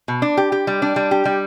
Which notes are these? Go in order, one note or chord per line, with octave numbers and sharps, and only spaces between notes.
B2
D4
G4
G4
G3
D4
G3
G4
G3